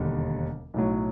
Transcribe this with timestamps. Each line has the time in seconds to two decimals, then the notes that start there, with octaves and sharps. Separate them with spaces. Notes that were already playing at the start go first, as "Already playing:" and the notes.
Already playing: E1 D#2 D3 G3
0.74 B1 A2 F#3